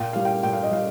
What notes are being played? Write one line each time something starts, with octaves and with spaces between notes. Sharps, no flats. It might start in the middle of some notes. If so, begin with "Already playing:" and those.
Already playing: A#2 G5
G3 F5
G5
A#2 G5
F5
D#5
G3 F5